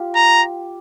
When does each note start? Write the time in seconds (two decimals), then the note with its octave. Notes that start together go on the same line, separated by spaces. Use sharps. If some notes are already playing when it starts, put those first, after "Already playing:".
Already playing: F4 G4
0.15 A#5